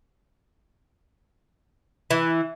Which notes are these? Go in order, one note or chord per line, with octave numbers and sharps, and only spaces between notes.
E3